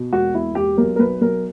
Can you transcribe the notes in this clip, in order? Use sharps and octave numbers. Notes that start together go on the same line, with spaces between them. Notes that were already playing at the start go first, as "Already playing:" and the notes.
Already playing: B2
E1 F#4
E1 E4
E1 G4
B1 A#4
A#4
B1 B4
B1 A#4